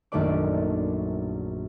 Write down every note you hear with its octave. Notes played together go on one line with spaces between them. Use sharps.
A#1 F#2 D#3 A3 D5 D6